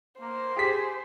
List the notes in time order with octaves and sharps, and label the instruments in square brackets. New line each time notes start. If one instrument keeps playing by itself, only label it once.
[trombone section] A#3 [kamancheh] C5
[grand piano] G4 B6 [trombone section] G#4